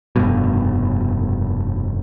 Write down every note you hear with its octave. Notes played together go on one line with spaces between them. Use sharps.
F1 G2 B2